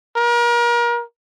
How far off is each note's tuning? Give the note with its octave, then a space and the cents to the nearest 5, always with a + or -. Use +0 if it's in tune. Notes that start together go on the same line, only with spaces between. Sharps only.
A#4 +35